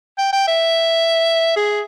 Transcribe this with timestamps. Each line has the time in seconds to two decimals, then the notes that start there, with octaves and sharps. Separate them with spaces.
0.18 G5
0.33 G5
0.48 E5
1.56 G#4